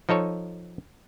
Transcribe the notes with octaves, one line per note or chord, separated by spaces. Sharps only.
F3 D#4 A4 C#5